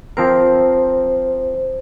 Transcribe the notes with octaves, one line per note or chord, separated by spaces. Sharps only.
F3 C4 A#4 C5